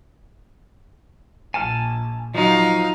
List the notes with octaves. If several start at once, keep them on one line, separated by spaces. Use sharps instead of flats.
A#1 G#5 A5 F6
F3 F#3 D#4 F5